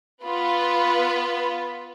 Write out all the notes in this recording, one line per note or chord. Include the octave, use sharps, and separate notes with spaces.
B3 F4 B4